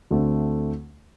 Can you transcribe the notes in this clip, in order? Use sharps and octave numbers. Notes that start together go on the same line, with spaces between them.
D2 D3 A3 C4